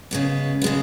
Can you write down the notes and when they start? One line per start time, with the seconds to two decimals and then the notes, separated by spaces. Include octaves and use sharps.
0.11 C#3 G#3 B3
0.62 C#3 G#3 B3